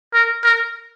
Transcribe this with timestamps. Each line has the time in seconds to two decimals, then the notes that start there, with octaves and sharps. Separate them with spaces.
0.14 A#4
0.44 A#4